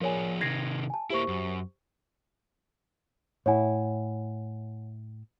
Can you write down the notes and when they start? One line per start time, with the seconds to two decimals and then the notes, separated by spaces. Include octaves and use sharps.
0.01 F3 G#4 A#4 C#5 G#5
0.41 C3 D#3 G#6 A#6 C7
0.90 G#5 A5
1.10 A#3 E4 G4 C5 C#6
1.28 F#2
3.46 A2 E4 C#5 F#5 G#5